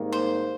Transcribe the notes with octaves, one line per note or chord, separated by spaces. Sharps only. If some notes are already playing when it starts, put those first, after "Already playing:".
Already playing: G#1 G#2 D#3 G3 A#3
C5